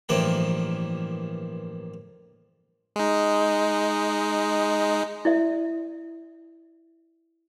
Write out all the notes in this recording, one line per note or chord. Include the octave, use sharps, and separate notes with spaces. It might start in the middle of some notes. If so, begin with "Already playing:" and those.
A1 G2 E3 F3 A#3 G5
G#3 D#4
E4 D5 E5